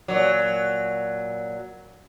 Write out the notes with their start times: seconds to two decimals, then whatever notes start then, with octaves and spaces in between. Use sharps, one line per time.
0.08 A#2 F#3